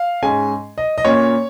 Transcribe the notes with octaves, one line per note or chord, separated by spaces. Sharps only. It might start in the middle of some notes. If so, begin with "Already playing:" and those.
Already playing: F5
G#2 G#3 C#4 G#5
D#5
D#5
A#2 A#3 C#4 C#5